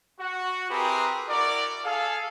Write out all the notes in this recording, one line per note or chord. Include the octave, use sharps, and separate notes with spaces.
F#4
C4 E4 G4 G#4 A#4 B4
E4 F#4 A#4 D5
G#4 A4 F5